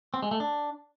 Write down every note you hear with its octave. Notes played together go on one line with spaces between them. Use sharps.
C4
G#3
A3
D4